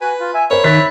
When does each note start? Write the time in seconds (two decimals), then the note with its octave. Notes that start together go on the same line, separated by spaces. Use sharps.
0.01 F#4 B4 G#5
0.20 F4
0.34 E5 G#5
0.50 A#4 C5 C#5 B5
0.64 D#3 E5 B5 F#6 A6 B6